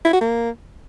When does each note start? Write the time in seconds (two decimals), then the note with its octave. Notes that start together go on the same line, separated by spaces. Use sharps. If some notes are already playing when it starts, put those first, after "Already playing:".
0.05 E4
0.13 F#4
0.21 A#3